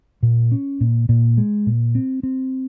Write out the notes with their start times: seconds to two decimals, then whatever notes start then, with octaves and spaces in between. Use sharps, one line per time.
0.23 A#2
0.52 C#4
0.81 A#2
1.09 A#2
1.38 G#3
1.67 A#2
1.95 C4
2.23 C4